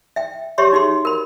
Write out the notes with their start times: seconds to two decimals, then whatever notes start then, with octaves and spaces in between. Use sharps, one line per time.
0.16 E5 G5
0.58 G4 C#5 E5 C6 C#6
0.73 D#4 F#4 G#4 C6
1.05 A#4 B5